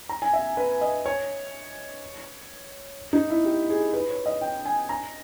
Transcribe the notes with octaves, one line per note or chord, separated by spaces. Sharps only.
A#5
G#5
E5
B4
D#5
C#5
D#4
E4
G4
G#4
B4
C#5
D#5
G5
G#5
A#5